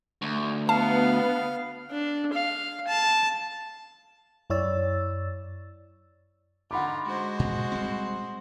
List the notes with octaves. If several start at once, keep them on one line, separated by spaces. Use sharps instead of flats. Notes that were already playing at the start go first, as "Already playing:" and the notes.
D2
B3 F5 A5
D4
F5
A5
F#2 E4 C#5 D5 E6 A6
D3 D#4 F4 F#5 B5 D6
G#3 F#4 C5
A#2
G3 C4